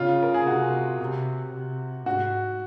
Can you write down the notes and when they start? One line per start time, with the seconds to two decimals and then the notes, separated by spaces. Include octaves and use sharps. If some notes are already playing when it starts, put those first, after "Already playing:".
Already playing: C#3 F4
0.23 A#4
0.34 G#4
0.46 C3 F#4
1.00 C3
1.52 C3
2.06 G#2 F#4